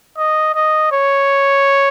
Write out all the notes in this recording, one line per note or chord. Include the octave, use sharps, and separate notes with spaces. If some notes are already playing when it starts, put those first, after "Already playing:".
D#5
D#5
C#5